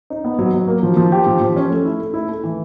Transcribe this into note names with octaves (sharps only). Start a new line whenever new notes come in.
D#4
B3
F#3
F#3
A#3
F3
F3
G4
F3
F3
C#4
A3
E4
A3
E4
A3
E3